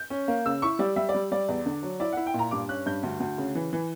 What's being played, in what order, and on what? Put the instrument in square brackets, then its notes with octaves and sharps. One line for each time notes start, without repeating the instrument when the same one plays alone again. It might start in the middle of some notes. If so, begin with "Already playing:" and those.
Already playing: [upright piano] G6
C#4
A#3
C#3 E6
E4 C#6
G3 D5
G3 E5
D5
G3
G3 D5
E2
D3
F#3
E4 D5
E4 F#5
G5
A#2 A#5
G2 D6
C#4 F#6
G2 G6
D2
D2
C#3
E3
E3